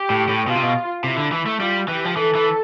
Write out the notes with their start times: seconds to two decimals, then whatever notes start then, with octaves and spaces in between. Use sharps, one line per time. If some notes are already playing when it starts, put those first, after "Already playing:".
Already playing: G4
0.10 A2
0.29 A2
0.47 B2 F4
0.55 C3
0.63 B2
1.04 C3 E4
1.17 D3
1.32 E3
1.46 A3
1.60 G3 F4
1.88 E3 G4
2.05 F3
2.16 E3 A4
2.35 E3